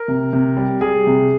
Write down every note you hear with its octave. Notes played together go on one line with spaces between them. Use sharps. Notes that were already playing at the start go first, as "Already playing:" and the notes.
Already playing: A#4
C3
C3
G3
G3 G#4
C3